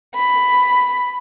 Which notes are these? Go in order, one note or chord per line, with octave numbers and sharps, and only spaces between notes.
B5